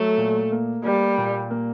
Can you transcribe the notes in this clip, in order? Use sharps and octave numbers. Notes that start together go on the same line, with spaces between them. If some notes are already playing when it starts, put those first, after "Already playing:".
Already playing: F#3 A3
A#2
A#3
G3 A#3
A#2
A#3